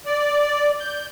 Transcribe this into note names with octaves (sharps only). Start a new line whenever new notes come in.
D5
G6